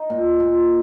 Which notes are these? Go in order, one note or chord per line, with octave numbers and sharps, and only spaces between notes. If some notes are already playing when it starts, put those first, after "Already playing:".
Already playing: D#4
A#2
A#2